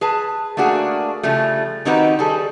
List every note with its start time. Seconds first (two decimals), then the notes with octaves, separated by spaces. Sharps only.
0.01 G#4 B4 A5
0.57 A3 A#3 D4 F#4 G#4
1.23 C#3 F3 G3 A3
1.85 D#3 C4 D#4 F#4 G4 B4
2.19 G3 G#4 A4